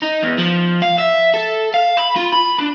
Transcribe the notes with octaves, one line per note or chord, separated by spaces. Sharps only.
D#4
E2
F3
F5
E5
A4
F5
B5
F4
B5
D4